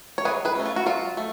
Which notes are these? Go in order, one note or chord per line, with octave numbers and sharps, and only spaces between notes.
C#5
F#3 G#4 B4
G#4 B4
A3 C#4
F4
F#4
F#3 F4
A3